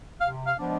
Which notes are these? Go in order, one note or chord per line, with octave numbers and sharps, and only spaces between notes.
C3 F5
F5
F3 G#3 B3 D4